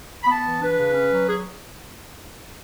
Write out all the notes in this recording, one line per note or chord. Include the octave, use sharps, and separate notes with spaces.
B5
B3 A5
E3
D4 B4
C#3
C#4
F#3
G#4